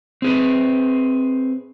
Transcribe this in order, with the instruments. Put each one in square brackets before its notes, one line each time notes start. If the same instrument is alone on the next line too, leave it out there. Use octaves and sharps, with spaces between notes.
[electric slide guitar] C4 G#4 B4